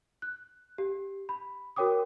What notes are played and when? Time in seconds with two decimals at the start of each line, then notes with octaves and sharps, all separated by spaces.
0.22 F#6
0.78 G4
1.29 B5
1.76 F#4 A#4 C#5 G5 D6 D#6